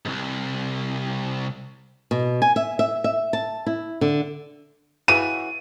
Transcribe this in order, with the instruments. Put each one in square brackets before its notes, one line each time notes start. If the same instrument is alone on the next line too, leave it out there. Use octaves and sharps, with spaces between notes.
[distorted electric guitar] C2 G#2
[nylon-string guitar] B2
G#5
E5
E5
E5
A5
E4
D3
[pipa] C#3 E3 F#4 [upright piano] D#7